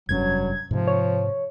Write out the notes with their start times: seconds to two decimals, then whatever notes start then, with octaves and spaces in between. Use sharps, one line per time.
0.09 F1 G2 F#3 C#4 G#6
0.71 G#2 C3 F3
0.87 C#5